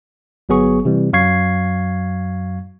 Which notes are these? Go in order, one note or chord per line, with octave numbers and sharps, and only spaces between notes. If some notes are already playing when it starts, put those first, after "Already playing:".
G1 F#3 B3 G#4 C#6
C3 E3 G3
F#2 F#3 F5 C#6 G#6 C7